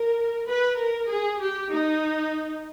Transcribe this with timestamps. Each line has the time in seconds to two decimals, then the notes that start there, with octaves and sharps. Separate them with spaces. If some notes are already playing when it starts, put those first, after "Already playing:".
Already playing: A#4
0.49 B4
0.80 A#4
1.10 G#4
1.41 G4
1.73 D#4